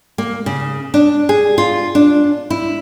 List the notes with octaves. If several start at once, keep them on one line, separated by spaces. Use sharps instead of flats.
A#3
C#3
D4
G#4
F4
D4
E4